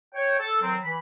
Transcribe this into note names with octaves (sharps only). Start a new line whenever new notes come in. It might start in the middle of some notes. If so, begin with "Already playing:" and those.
C#5 G5
A4
D#3 F#3 C4
E3 B5